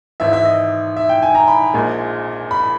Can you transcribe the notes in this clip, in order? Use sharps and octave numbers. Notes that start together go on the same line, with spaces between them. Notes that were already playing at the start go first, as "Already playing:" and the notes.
G#1 G#2 E3 E5
E5
D#5
E5
G5
G#5
A#5
B5
A#1 A#2 G#3
B5